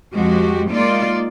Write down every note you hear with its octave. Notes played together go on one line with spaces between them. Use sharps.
F2 F3 G#3 F#4 G4
G#3 A#3 D#4 F4 D5